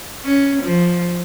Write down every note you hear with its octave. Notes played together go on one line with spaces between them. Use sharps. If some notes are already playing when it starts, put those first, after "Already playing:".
C#4
F3